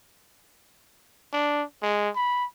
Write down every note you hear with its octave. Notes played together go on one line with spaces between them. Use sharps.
D4
G#3
B5